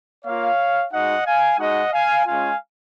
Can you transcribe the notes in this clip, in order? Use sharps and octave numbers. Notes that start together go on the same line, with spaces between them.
A#3 F4 C#5 F5
G#3 D#4 F#4 D#5 F#5
F5 G#5
G#3 D#4 F#4 D#5 F#5
F5 G#5
G#3 C#4 F4 F5 G#5